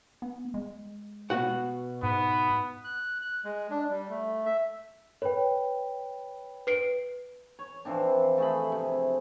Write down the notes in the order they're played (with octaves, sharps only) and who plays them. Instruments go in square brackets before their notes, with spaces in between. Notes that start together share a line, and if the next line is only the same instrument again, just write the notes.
[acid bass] B3
G#3
[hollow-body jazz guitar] B2 F#4 F#5
[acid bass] G#2 [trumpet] B3
[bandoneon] F#6
F#6
G#3
D4
G3
A3
E5
[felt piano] B4 [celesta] C#5 G5
[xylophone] B4 C7 D7
[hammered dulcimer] C#5
E3 F3 C4 D4
A3 G#4 B5
C3